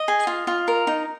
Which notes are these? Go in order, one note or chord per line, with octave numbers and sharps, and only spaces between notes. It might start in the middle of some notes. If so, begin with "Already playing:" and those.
Already playing: D#5
G#4
F4
F4
A#4
D#4